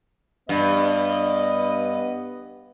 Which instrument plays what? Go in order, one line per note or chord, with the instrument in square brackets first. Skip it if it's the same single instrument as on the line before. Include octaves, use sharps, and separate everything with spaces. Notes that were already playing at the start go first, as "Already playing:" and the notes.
[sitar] G2 [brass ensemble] B3 D#5